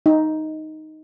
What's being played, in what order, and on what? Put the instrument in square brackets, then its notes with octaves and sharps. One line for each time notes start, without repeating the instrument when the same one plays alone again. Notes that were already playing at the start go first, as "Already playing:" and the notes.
[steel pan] D#4